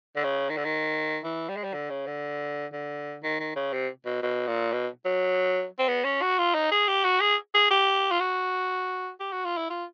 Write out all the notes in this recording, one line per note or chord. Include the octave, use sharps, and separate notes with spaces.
D3
C#3
D#3
D3
D#3
E3
G3
G#3
G3
D3
C#3
D3
D3
D#3
D#3
C#3
C3
B2
B2
A#2
B2
F#3
C4
B3
C#4
F#4
F4
D#4
G#4
G4
F#4
G#4
G#4
G4
F4
F#4
G4
F#4
F4
E4
F4